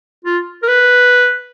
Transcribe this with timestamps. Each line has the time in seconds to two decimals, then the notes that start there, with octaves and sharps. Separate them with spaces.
0.25 F4
0.62 A#4
0.68 B4